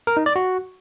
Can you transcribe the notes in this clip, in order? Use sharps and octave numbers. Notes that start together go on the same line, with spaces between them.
A#4
D#4
D5
F#4